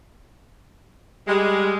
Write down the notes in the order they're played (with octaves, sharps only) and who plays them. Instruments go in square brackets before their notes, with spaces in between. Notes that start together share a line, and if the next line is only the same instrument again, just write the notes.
[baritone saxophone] G3 [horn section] G#3